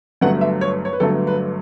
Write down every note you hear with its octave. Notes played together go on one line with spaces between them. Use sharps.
G1 G2 F#3 A3 F#5
E5
C#5
C#5
B4
G1 G2 F#3 A3 A4
B4